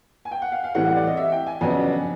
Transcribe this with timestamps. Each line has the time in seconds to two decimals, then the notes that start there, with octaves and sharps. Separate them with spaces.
0.25 G#5
0.31 G5
0.42 F#5
0.52 F5
0.64 F5
0.75 A2 E3 G3 C4 F#5
0.85 F#5
0.96 D5
1.07 D#5
1.17 E5
1.32 G5
1.47 G#5
1.61 F2 C#3 F#3 B3 D4 G#5